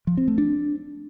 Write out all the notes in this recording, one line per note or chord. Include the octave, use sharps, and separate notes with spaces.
F3
C4
A3
D4